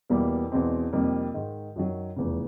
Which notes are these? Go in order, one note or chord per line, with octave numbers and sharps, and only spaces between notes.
E2 B2 G3 A#3
E2 B2 G#3 C4
F2 C3 D#3 G3 A#3
G#2 D#3 G#3
F#2 D#3 F#3
F1 E2 C#3